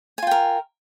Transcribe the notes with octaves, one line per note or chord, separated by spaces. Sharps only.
F4 A#4 G5 G#5